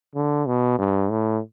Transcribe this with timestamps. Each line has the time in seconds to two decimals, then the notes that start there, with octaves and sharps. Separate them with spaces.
0.15 D3
0.46 B2
0.79 G2
1.10 A2